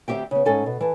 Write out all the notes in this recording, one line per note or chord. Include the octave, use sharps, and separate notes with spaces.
D2 C4 G4 E5 G5
C#3 B3
G#2 C#4 A4 G#5
B2
E3 A5